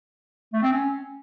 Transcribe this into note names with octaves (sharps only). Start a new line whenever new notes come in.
A3
C4
C#4